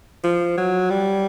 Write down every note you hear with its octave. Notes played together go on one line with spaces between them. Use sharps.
F3
F#3
G3